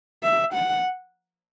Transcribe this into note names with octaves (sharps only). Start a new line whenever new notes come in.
E5
F#5